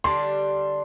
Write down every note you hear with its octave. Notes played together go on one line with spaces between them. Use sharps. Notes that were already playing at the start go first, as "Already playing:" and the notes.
D3 G3 D4 C6